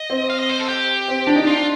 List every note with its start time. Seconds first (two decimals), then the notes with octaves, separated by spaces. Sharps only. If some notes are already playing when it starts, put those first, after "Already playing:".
Already playing: D#5
0.10 C4
0.30 F5
0.39 D#5
0.49 C5
0.59 A4
0.69 G4
1.08 C4
1.27 D4
1.36 D#4
1.43 D4 F4